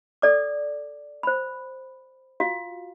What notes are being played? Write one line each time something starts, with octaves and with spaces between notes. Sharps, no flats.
A4 D5 D6
C5 B5
F4 F#4 F5